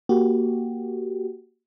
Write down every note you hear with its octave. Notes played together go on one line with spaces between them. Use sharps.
A#3 F#4 G4